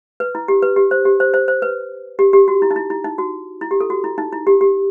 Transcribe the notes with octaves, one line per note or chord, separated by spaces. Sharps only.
B4
E4
G4
B4
G4
C5
G4
C5
C5
C5
B4
G4
G4
F#4
E4
D#4
E4
E4
D#4
F#4
E4
G4
A4
F#4
E4
D#4
E4
G4
G4